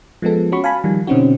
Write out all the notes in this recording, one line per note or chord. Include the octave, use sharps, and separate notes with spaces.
F3 G#3 B3 A4
C#4 F#4 B5 C#6
F5 G#5 A5 B5
D#3 F3 G3
B2 D3 C4 C#4 D#4 F#4